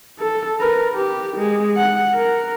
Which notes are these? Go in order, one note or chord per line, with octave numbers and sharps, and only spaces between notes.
A4
A#4 B4
G4
G#3
F#5
A#4